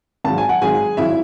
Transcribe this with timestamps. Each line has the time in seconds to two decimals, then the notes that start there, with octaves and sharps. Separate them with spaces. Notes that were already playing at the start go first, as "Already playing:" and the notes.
0.24 G#1 G#2 F#3 A5
0.38 G#5
0.49 F#5
0.62 G#1 G#2 F#3 G#4 G#5
0.97 G#1 F#3 E4 E5